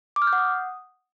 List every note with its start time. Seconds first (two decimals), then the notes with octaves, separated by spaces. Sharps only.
0.16 D6
0.22 F6
0.27 G6
0.33 F#5
0.38 D#6